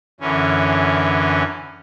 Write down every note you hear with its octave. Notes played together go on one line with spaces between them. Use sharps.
F#2 D3 E3 C#4